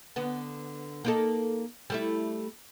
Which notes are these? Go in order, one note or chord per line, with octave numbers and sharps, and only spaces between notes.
D3 B3
A#3 D#4 A4
G3 A3 E4